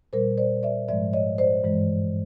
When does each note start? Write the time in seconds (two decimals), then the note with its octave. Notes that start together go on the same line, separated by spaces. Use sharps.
0.13 A#2 G3 A#4 C5
0.38 C5 D5
0.63 D5 E5
0.88 G#2 F3 G#3 D5 E5
1.13 C#5 D#5
1.38 C5 D5
1.64 G2 E3 G#3